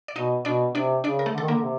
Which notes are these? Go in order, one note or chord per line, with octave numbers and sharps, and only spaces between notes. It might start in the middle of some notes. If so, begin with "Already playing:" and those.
D5
B2 D#4 D#5
B2 D4 D5
C3 D4 D5
C#3 D4 D5
A#4
A3 A4
D3
D#3 A4
D3 A#3 A#4
C3